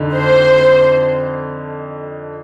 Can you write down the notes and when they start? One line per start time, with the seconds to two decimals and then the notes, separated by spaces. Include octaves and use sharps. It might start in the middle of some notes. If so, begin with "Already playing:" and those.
Already playing: F2 D3 D#4
0.16 C5